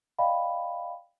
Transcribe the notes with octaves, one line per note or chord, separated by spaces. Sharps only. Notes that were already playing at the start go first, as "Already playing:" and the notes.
D5 D#5 F5 G5 B5